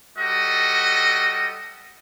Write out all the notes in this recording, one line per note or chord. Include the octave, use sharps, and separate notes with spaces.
G3 F#4 A4 D#5